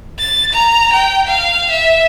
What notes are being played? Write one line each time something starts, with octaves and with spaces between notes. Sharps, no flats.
A6
A#5
G5
F5
E5